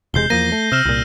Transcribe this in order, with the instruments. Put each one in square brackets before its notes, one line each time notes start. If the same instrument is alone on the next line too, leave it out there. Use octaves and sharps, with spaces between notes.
[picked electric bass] E1 C3 G#3 [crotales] G6 C7 G7
[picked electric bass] E2 F3 A#3 [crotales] A#6 D#7
[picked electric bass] A3
[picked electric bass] C3 [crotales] E6 F6 E7
[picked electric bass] C2 A#2